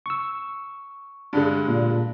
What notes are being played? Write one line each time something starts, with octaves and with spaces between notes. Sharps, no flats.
C#6 E6
G2 D3 G#3
A#2